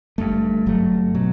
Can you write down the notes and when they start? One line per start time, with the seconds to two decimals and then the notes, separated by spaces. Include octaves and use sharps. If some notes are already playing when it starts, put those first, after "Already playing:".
0.18 G1 G2 F#3 A3
0.66 G1 G2 F#3 A3
1.15 B2 F#3